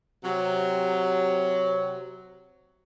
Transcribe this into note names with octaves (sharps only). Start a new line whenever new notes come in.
C3 F#3